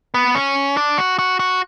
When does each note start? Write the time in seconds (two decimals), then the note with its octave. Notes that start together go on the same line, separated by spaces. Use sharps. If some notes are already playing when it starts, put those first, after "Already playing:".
0.14 B3
0.35 C#4
0.77 D4
0.98 F#4
1.19 F#4
1.40 F#4